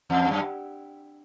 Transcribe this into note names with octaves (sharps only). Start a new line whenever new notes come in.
E2
G2
F#2